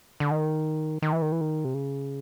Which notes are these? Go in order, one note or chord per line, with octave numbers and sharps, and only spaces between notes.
D3
D#3
D#3
E3
D#3
E3
D#3
C3
C#3